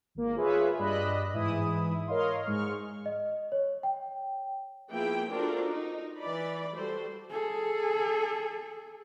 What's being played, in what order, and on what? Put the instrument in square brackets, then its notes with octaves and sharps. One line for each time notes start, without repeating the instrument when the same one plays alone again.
[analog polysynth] G#1 A#3
F4 G#4 B4 C#5 E5
G2 D5 D#5 B5 E6 F#6
G#2 E3 E4 D#6
A#4 C#5 D#5 F5 C6
G#2 G#3 C#6 F6
[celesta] D#5
C#5
G5
[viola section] F3 A#3 B3 E4 G#4 G5
D4 F4 F#4 A4 A#4 C5
D#4
E3 D5 B5
G3 F#4 A4 C5
[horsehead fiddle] G#4 A4